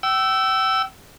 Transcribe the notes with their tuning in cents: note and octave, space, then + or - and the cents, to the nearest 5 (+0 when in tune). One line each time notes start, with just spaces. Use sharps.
G5 -35 E6 +0